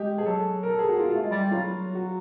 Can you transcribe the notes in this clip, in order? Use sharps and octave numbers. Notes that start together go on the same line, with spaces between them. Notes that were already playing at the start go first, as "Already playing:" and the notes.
Already playing: G#3 G4
G#4
F#3 A4
A#4
A4
G#4
F#4
F4
A3 F4
G#3
G3
F#3 F4
F#4